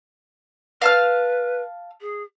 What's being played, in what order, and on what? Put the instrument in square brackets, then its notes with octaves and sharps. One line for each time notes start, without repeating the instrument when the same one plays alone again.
[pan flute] B4 [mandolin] F5 A5 F6
[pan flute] G#4